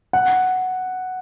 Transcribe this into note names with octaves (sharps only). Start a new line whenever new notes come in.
F#5